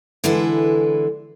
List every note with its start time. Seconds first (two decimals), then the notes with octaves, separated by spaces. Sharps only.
0.24 D3 E3 G#3 E4 A4 B4